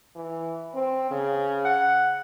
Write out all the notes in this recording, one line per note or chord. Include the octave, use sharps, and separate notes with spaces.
E3
C4
C#3
F#5